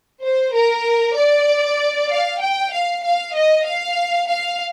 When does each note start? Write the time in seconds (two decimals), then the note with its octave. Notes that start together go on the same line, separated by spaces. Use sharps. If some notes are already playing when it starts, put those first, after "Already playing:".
0.23 C5
0.54 A#4
1.17 D5
2.10 F5
2.41 G5
2.72 F5
3.04 F5
3.35 D#5
3.66 F5
4.28 F5